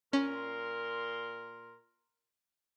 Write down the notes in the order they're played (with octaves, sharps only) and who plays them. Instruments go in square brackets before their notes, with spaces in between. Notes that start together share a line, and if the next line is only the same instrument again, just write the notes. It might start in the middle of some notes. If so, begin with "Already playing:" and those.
[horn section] A#2 A#4 C6 [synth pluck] C#4